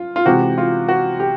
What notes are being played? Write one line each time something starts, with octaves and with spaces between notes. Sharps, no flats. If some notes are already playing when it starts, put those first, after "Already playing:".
Already playing: F4
F4
C3 E3 G#3 C4 F#4
F4
F#4
G4